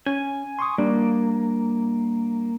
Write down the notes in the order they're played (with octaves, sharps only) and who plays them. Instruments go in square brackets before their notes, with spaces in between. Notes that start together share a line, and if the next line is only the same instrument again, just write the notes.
[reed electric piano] C#4 [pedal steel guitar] G#5
[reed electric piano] C6 C#6 D#6
[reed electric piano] G3 D4 [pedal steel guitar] A#3